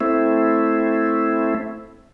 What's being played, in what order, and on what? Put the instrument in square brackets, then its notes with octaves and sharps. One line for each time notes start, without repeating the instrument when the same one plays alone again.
[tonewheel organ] A3 C4 E4